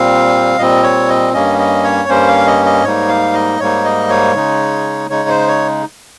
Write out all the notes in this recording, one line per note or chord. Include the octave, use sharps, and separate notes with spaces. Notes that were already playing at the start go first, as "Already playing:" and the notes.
Already playing: A#2 G3 C4 F5
A#2 G3 C4 D#5
C#5
D#5
G2 G3 A#3 C#4 D#5
D#5
C#5
G2 G3 A#3 C#4 C5
F5
D#5
D#5
G#2 G3 A#3 D#4 C#5
F5
D#5
G#2 G3 A#3 D#4 C#5
D#5
C#5
C#3 G#3 D#4
C#3 G#3 D#4 C#5
C5
C#5